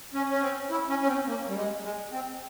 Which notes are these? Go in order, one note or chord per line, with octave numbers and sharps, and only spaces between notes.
C#4
C#4
C4
E4
C#4
C#4
C4
A#3
G3
G#3
G#3
C4